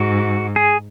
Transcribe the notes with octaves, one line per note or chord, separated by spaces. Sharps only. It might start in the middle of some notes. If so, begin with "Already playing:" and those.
Already playing: G#2 F#4
G#4